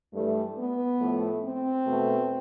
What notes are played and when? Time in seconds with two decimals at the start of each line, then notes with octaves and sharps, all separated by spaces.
0.14 G2 E3 G3 A3
0.58 B3
1.00 A2 F3 A3
1.43 C4
1.87 E2 B2 A3